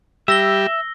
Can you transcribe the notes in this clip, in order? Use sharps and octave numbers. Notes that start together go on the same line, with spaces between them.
G3 G4 E5 E6 A#6 G7